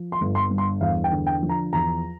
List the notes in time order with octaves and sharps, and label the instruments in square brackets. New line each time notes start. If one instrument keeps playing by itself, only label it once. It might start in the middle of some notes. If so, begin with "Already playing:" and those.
Already playing: [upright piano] F3
C6
G1
C6
G2
C6
E2 F5
G5
D3
G5
F3
A#5
E2 A#5